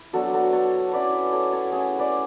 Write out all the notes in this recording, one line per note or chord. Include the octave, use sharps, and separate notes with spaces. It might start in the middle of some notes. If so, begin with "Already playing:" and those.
Already playing: E4
F#3 B3 D4 F#4 A4
F#4 A4
A4 C#5
F#3 C#4 E4 B4 D5
A4 C#5
A4 C#5
A3 C#4 E4 G#4
B4 D5